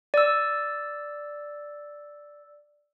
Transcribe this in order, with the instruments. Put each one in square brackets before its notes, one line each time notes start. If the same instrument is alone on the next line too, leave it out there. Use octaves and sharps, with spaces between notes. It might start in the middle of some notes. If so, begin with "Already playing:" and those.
[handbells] D5 E6